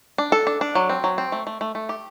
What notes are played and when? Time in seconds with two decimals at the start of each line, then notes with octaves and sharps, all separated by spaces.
0.18 D4
0.32 A4
0.47 D4
0.61 D4
0.75 F#3
0.89 C4
1.04 F#3
1.18 C4
1.32 A3
1.47 A3
1.61 A3
1.75 A3
1.89 G4